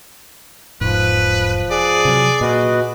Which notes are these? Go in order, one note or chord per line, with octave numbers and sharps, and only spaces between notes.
E1 G#2 F3 B4
G#4 D5
C3 F#3
A#2 F#4 B4 D#5